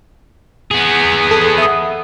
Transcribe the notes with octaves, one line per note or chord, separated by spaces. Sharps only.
B3 G#4
A4
E5 D#6